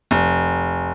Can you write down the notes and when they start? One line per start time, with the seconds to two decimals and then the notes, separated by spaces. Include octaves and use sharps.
0.11 F1